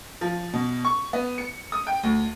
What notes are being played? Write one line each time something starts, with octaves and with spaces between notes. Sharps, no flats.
F3
B2
C#6
B3
C#7
D#6
G5
D2